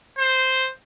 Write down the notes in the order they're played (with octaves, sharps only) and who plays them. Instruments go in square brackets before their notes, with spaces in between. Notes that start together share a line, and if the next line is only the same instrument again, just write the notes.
[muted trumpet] C5